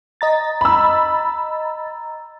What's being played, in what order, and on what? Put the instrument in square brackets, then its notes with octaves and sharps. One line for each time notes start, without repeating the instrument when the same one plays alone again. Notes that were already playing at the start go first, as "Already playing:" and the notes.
[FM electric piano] D#5 A#5 A6
[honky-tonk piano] B5 E6